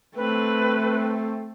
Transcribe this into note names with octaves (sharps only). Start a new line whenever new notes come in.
A3 C4 B4